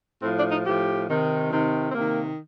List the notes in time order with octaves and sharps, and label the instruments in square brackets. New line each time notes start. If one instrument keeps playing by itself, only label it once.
[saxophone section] A2 F3 C4
D4
D#4
A2 F3 G4
C3 D#3
C3 D#3
C4
C3 D#3 A#3